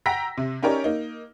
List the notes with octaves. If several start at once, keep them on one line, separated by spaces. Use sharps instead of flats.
F#5 G5 A#5 E6 A#6 B6
C3
C#4 D#4 G4 A#4 C#5 D5
A#3 D#4